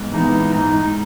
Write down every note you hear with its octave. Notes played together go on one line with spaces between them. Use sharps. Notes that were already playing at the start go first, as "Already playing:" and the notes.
Already playing: G#2 B3
E3 B3 D#4
G#2 D#4